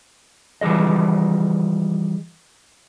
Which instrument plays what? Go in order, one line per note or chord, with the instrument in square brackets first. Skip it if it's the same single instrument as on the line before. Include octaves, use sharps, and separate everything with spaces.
[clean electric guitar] E3 F3 G3 G#4 D#5